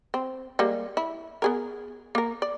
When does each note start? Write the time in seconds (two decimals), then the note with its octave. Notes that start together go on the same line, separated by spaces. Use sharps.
0.14 C4
0.59 G3 G#3 A#3
0.97 E4
1.42 B3 G#4 A#4
2.15 A#3 A#4
2.42 D5